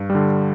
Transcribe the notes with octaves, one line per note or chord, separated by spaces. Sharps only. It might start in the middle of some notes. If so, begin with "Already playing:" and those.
Already playing: G2
G3
D3